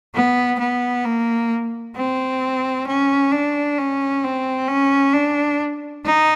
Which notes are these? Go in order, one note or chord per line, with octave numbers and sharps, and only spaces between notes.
B3
B3
A#3
C4
C#4
D4
C#4
C4
C#4
D4
D#4